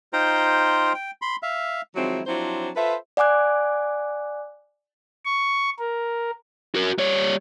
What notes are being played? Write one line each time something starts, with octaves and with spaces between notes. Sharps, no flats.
D#4 F4 C5 G5 A#5 C6
G5
B5 C6
E5 F5
D#3 F3 F#3 G#3 C4 E4
F3 F#3 C4 D4 E4 C5
F4 A4 B4 C5 E5
D5 F#5 G#5 D6 F#6
C#6
A#4
F#4 A#4
G3 C#5